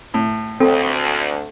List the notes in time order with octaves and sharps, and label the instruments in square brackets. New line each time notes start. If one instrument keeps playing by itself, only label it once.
[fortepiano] A2
[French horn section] D2 [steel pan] C4 [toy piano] A4